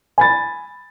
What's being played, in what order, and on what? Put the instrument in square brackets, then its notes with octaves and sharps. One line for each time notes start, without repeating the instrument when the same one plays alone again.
[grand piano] G#5 B5 A6